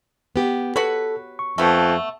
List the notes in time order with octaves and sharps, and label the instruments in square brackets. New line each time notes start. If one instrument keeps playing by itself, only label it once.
[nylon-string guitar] B3 G4
[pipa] F#4 B4 [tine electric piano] A4 [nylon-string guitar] C#5
[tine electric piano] C#6
[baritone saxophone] F2 [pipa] A3 B3